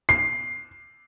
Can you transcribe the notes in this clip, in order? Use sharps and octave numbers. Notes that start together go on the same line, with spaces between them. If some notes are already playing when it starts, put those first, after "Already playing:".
C7